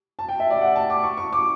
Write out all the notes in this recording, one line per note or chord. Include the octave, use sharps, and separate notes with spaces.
A5
G5
E5
D5
F#5
A5
D6
C#6
C#6
D6